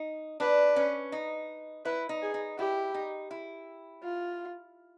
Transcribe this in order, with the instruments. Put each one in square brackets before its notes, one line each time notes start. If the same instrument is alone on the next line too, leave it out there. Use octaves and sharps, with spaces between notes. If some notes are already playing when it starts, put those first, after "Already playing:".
Already playing: [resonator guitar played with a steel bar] D#4
[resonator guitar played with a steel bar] D4 [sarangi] B4
[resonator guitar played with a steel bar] C#4
D#4
[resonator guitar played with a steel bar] E4 [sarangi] B4
[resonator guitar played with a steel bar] D#4
[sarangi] G#4
[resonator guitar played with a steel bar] D#4
[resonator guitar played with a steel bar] E4 [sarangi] G4
[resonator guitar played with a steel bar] D#4
E4
[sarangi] F4